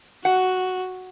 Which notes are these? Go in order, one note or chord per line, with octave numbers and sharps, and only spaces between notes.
F#4 F#5